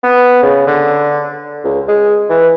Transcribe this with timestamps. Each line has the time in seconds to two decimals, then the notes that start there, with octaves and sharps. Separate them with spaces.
0.03 B3
0.43 C#3
0.67 D3
1.64 C#2
1.88 G#3
2.30 E3